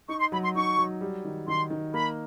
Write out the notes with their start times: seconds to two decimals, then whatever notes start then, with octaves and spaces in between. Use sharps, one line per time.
0.08 D#4 C#6
0.20 C6
0.32 F#3 B5
0.44 C6
0.55 D#4 C#6
0.78 F#3
1.01 G3
1.25 D#3
1.47 D#3 C6
1.70 D#3
1.94 A#3 B5